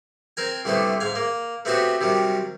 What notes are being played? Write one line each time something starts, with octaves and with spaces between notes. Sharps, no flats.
C4 A#4 G#5
C2 D3 A3 B3 C5
G#2 F5 G#5
A#3
A3 B3 C4 F#4 G4 C5
C3 D#3 F#3 G3